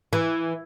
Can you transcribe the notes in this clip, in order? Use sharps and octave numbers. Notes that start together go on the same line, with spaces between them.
E3